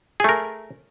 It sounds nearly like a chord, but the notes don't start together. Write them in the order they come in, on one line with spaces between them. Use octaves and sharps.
G#4 A3 A#4